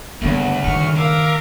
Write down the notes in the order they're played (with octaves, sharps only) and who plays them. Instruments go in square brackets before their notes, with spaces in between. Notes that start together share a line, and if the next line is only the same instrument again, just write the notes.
[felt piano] F#1 G2 A3 [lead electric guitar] D2 [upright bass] B3
[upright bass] D#3 [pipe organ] C#6 F6
[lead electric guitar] A#4 [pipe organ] E5 F5 D6